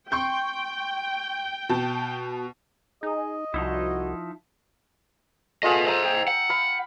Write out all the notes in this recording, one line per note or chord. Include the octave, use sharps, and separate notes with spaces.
G5 C6 C#6 G6
B2 A5
D#4 G#4 D#5
C2 F3 D#4 E4 F#4
A3 F4 G#4 B4 D#5
C5 D#5 E5 A#5 E6
G5
F#5
F5 B5